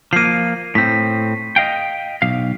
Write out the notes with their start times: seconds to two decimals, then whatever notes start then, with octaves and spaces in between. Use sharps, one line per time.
0.13 F3 A#3 C7 D#7
0.75 A2 C4 B6
1.56 D#5 F5 G5
2.22 B1 F5